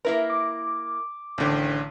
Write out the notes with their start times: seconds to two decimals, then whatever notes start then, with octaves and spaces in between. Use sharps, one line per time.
0.05 A#3 E4 A#4 B4
0.30 D6
1.38 A1 D3 D#3 C4